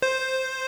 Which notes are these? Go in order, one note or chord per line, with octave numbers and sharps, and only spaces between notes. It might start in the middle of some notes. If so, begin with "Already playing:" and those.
C5